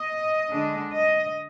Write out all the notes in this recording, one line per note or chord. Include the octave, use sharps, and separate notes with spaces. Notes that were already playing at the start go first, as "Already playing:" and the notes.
Already playing: D#5
D3 G#3 D4
D#5